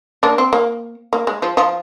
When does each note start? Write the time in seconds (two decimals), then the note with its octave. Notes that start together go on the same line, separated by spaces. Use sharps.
0.23 A#3 D4
0.38 C4
0.53 A#3
1.13 A#3
1.27 G#3
1.42 F3
1.57 F3